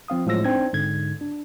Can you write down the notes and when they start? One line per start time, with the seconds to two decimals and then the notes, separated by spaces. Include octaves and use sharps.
0.08 F3 C4 F5 D#6
0.26 A2 F3 F#3 G#3 E6 A#6
0.44 C4 D4 D#4 G#6
0.73 G#2 D3 G#6
1.21 D4